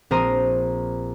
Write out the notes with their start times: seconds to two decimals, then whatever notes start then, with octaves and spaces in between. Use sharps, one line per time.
0.11 A#1 C4 A#4 C5 A#5 D#6